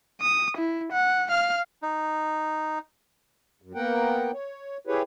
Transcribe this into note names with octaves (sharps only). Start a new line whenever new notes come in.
D#6
E4
F#5
F5 F6
D#4
F#2
A#3 B3 A#4 F#5 G5
C#5
E4 G4 G#4 B4 C#5